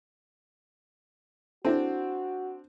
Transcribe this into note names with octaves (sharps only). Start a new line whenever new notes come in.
C4 D4 E4 F#4 A4